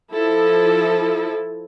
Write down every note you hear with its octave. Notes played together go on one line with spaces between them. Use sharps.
F3 E4 A4